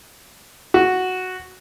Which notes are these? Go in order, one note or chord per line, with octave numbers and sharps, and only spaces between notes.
F#4